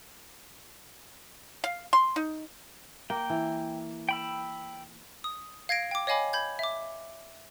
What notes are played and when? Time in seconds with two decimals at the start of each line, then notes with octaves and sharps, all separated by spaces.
1.64 F5
1.93 C6
2.16 D#4
3.10 A#3 G5
3.30 E3
4.09 G5 B5 E6
5.24 D#6
5.69 F5 G#6 A#6 D7
5.91 G5 D6
6.07 C#5 D#5 F5 G#5 B5 D6
6.33 B5 G6 G#6
6.59 E5 D6